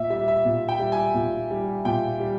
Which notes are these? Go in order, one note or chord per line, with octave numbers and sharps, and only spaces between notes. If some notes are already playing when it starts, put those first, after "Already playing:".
Already playing: A#2 E5
G3 E5
E5
A#2
G5
G3
G#5
A#2
G3
A#2 G5
G3